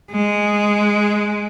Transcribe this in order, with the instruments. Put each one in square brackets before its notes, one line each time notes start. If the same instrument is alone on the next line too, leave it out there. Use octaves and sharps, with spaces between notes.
[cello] G#3